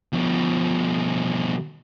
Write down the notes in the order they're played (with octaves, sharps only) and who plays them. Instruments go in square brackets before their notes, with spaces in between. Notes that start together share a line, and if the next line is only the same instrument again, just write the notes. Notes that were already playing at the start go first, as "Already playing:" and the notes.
[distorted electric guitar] B2 F3